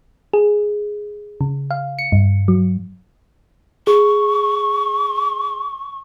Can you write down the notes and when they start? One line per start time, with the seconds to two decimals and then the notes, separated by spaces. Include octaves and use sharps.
0.33 G#4
1.41 C#3
1.71 F5
1.99 C#7
2.12 G2
2.48 F#3
3.87 G#4 C#6